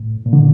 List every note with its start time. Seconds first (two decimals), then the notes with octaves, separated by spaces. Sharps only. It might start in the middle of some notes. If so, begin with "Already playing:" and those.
Already playing: A2
0.26 A#2
0.33 D3